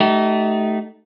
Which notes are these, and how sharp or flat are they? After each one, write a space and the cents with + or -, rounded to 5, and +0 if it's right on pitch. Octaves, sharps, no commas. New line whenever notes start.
A3 -20 D#4 +0 G4 -45